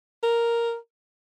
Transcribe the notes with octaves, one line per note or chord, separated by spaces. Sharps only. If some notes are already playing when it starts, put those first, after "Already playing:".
A#4